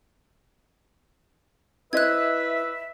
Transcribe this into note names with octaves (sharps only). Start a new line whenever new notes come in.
E4 B4 C5 D#5 E5 F#6 G#6